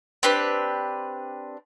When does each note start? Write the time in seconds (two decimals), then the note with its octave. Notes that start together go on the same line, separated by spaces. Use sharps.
0.23 C4 D4 G4 B4